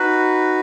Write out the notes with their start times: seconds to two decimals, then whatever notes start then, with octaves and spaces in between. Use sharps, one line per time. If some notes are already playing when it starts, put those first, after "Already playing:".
Already playing: D#4 F#4 B4 F#6